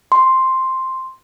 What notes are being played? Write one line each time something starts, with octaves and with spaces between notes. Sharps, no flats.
C6